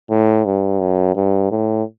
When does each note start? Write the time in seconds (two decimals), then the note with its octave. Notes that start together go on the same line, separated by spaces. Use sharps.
0.10 A2
0.45 G2
0.80 F#2
1.16 G2
1.51 A2